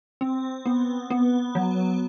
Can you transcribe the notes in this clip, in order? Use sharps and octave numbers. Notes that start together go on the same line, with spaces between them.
C4
B3
B3
F#3